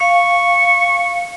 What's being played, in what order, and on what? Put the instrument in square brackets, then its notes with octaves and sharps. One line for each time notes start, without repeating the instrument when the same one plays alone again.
[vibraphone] F5 [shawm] C#6